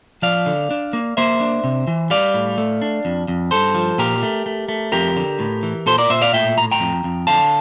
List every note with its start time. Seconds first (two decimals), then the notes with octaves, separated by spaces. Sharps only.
0.22 F3 D5 F5
0.46 D3
0.71 D4
0.93 A#3
1.17 A#3 C5 E5
1.40 D4
1.64 C3
1.87 E3
2.10 G3 D5 F5
2.34 A2
2.58 A3
2.82 D4
3.05 F2
3.28 F2
3.51 G2 A4 C5
3.75 F3
3.98 A#2 G4 A#4
4.23 A3
4.46 A3
4.69 A3
4.92 F2 G4 A#4
5.16 D3
5.40 A2
5.63 E3
5.86 A#2 A4 C5
5.98 A#4 D5
6.10 A#2 C5 E5
6.22 D5 F5
6.33 A2 E5 G5
6.57 A2 A#5
6.71 G5 A#5
6.80 F2
7.04 F2
7.27 D3 F5 A5